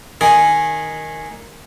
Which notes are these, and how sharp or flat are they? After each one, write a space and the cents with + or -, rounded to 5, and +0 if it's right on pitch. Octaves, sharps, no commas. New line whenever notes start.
D#3 +0 G#4 +0